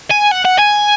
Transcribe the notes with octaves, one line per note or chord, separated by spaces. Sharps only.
G#5
F#5
F#5
G#5